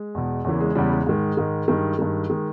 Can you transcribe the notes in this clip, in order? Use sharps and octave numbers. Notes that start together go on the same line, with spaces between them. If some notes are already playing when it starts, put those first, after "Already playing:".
Already playing: G#3
E2 B2
E2 C#3 E3 A#3
G#3
E2 C#3 E3 G3
G#3
G#2 D#3 G#3
G#2 D#3
G2 D#3
G2 D#3
D#3 G#3